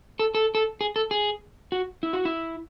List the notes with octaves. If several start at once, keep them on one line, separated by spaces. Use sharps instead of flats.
A4
A4
A4
G#4
A4
G#4
F#4
E4
F#4
E4